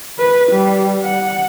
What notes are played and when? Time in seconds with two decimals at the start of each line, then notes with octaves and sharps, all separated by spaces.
0.19 B4
0.51 G3
1.03 F#5